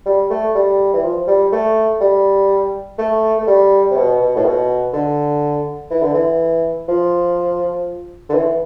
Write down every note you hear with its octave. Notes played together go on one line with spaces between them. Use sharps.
G3
A3
G3
E3
F3
G3
A3
G3
A3
A3
G3
C3
B2
B2
A2
B2
D3
E3
D3
E3
F3
D3
E3